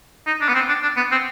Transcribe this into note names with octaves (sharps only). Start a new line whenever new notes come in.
D#4
D4
B3
C4
D4
D4
B3
C4